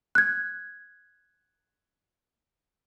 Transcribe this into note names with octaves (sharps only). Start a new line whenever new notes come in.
F#6 G#6